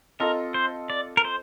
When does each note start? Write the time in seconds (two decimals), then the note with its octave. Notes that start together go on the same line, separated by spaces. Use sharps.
0.20 C4 F4 A4 A#4 D#5
0.54 C5
0.90 D5
1.17 A#4
1.25 C5